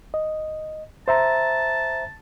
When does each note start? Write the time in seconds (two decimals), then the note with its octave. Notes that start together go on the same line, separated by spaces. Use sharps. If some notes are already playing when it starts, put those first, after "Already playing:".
0.14 D#5
1.08 C5 E5 A5 A#5